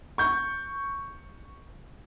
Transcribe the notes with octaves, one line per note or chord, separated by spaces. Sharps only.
C#6 G6